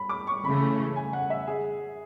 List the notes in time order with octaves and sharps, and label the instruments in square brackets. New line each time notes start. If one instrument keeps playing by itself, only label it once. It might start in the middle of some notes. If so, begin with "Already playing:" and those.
Already playing: [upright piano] B5
D6
C#6
[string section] C#3 E3 A3 [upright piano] B5
[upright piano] G#5
F#5
E5
G#4